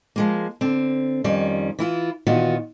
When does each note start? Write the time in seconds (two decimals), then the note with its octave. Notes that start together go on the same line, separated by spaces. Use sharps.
0.16 F3 G#3 A#3
0.61 D3 C4
1.24 F2 D#3 G3 C#4
1.79 E3 E4 F4
2.27 A#2 D#3 E3 B3 F4 F#4